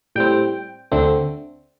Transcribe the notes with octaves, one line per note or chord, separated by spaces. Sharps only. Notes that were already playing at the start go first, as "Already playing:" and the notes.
A2 G3 C4 G5
D2 D3 A3 C4